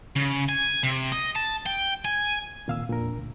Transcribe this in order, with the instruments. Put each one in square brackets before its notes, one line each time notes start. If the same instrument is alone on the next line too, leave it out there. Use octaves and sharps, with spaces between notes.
[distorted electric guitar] C#3
G#5
C3
D#5
A5
G5
G#5
[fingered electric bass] D1 D#3 C4 [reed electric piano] A#2 F5 E6
[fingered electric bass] E1 F2 D4 [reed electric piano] A#2 A#4
[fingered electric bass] D2 A#2